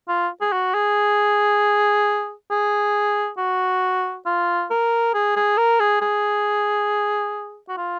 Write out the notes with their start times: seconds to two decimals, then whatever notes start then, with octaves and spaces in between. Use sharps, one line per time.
0.09 F4
0.41 G#4
0.52 F#4
0.75 G#4
2.51 G#4
3.38 F#4
4.26 F4
4.71 A#4
5.14 G#4
5.36 G#4
5.58 A#4
5.80 G#4
6.01 G#4
7.69 F#4
7.78 F4